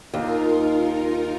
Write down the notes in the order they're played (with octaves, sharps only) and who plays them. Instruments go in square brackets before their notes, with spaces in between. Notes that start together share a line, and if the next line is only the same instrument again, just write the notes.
[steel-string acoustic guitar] D#2 [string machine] D#4 F4 A#4